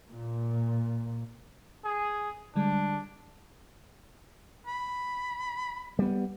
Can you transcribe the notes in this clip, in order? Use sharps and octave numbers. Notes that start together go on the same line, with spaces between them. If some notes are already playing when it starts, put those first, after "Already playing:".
A#2
G#4
D3 G3 G#3 D4
B5
G3 B3